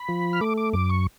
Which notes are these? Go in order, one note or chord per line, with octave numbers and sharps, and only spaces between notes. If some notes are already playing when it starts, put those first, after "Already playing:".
Already playing: B5
F3
F6
A3 D6
D6
F#2 D6
C#6